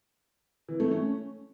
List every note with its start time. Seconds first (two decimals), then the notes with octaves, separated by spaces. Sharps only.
0.68 E3
0.80 A3
0.91 C#4